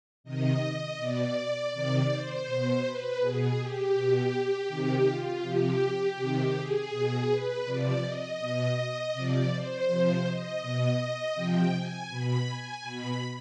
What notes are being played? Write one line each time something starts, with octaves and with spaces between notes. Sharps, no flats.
C3 D#3 D#5
B2 D5
C3 D#3
C5
B2
B4
B2 G#4
G4
B2
C3 D#3
F4
C3 F3 G4
C3 D#3
G#4
B2
B4
C3 F3 D5
D#5
B2
C3 F3 D5
C5
C3 F3
D#5
B2
C3 F3 G5
G#5
B2 B5
G#5
B2 B5